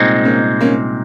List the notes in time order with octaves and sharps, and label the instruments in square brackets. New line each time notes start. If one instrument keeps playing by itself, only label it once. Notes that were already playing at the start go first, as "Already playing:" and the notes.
Already playing: [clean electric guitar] C2 A#2 G#3 C4 D#4
[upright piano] A#3 C#4
A#3 C#4